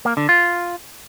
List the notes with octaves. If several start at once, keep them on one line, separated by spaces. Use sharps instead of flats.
A#3
D3
F4